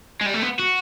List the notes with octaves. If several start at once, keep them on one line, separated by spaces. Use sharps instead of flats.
G#3
G3
A3
B3
F#4